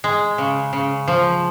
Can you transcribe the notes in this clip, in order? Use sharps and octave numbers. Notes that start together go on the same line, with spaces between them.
G#3
C#3
C#3
F3